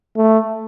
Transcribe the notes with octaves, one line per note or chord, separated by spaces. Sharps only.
A3